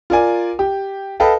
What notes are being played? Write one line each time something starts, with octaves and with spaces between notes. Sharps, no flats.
F4 A#4 D5 G#5
G4
A4 B4 D#5 F5 G5 A5